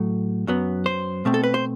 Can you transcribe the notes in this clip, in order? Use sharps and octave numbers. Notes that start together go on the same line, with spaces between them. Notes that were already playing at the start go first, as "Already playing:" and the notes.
Already playing: A2 F#3 A3
F#2 F#3 B3
C5
B2 A3 C4
A4
B4
C5